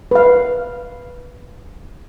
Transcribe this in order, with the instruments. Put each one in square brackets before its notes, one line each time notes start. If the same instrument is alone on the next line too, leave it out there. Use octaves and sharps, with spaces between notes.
[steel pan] B4 F5